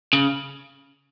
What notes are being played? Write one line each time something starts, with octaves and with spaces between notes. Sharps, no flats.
C#3